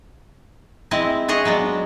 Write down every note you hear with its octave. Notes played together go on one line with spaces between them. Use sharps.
G#3 C4 E4 D#5
F#4 G#4 C#5 D#5
F#3 G#3 B3 D4